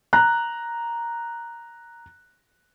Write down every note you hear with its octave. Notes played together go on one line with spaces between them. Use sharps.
A#5 F#6